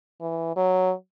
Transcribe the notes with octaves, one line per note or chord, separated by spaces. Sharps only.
E3
F#3